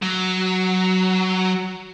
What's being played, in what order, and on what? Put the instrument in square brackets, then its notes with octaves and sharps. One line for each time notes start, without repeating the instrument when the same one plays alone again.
[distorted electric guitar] F#3